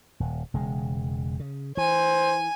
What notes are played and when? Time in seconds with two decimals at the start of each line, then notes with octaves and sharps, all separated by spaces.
0.20 D#1
0.54 E1 C#3 G#3
1.40 C#3
1.77 E3 C5 G#5